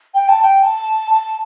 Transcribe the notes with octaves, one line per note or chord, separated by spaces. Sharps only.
G5
A5
G5
A5
A5